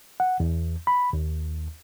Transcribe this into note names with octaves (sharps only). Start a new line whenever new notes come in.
F#5
E2
B5
D#2